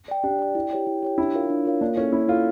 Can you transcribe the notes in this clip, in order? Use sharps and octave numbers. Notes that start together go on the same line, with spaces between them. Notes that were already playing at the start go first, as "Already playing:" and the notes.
D5 G5
D4 G4
D5 G5
E4
G4 C#5 G5
E4
G4 C#5 G5
D4 E4
F4 A#4 C#5 F5
D4
F4 A#4 C#5 F5
A#3 D4
C#4 E4 A4
A#3 E4
E4 F4 A4